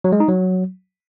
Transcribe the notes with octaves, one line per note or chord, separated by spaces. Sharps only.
F#3
G#3
D#4
F#3